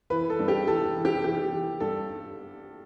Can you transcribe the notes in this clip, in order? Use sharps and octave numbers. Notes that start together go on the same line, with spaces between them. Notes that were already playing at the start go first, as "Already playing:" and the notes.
E3 B4
A4
G2
G4
E3 A4
E3
G4
E3 G4
E3
G2 A4